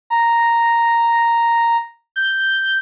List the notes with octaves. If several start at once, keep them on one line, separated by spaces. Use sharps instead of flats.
A#5
G6